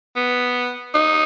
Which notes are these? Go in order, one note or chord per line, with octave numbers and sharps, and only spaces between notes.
B3
D#4